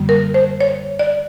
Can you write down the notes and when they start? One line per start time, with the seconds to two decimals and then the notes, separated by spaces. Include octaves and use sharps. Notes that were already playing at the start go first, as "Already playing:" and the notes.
Already playing: F#2 D3 G3 A#3
0.09 A#4
0.34 C5
0.61 C#5
0.99 D5